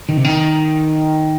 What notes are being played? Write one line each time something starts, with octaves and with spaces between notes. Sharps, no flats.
D#3
C3
D#3